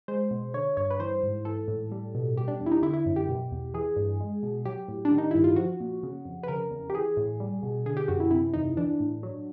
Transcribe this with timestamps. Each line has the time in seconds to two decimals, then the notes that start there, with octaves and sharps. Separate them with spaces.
0.08 G#3 C5
0.31 B2
0.54 D3 C#5
0.77 G2 C#5
0.90 B4
1.00 E3 C5
1.23 G#2
1.45 E3 A4
1.68 A2
1.91 G3
2.15 B2
2.36 B2 G4
2.48 D4
2.60 E2
2.66 E4
2.72 D#4
2.82 D3 E4
2.93 E4
3.06 F#2
3.16 G4
3.28 B2
3.51 E2
3.74 E3 G#4
3.96 G2
4.20 G#3
4.43 B2
4.65 F#3 G4
4.88 A2
5.05 D4
5.11 D#3
5.18 D#4
5.31 G2 E4
5.44 F4
5.56 F3 F#4
5.80 A#2
6.03 C#3
6.25 F2
6.43 B4
6.48 C#3 A#4
6.71 E2
6.90 G4
6.94 E3 G#4
7.17 A2
7.40 G3
7.63 B2
7.86 D3 G#4
7.97 G4
8.08 F#2 F#4
8.20 E4
8.31 C3 E4
8.54 E2 D#4
8.77 E3 D4
9.00 A2
9.23 F#3